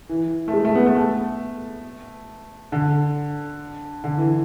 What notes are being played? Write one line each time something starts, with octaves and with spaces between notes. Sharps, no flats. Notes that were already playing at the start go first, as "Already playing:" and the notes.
E3
A3
G#3
A3
B3
A3
A3
D3
D3
E3